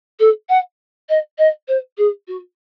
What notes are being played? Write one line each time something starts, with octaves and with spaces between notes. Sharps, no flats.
A4
F#5
D#5
D#5
C5
G#4
F#4